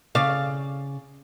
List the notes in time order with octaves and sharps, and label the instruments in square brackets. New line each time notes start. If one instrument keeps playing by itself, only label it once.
[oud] C#3 D5 F5